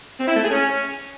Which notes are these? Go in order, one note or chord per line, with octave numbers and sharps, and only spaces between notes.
C4
E4
A3
G#4
C#4